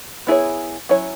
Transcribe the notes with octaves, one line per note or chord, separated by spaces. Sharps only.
B3 E4 G#4 C#5
F#3 C#4 E4 C#5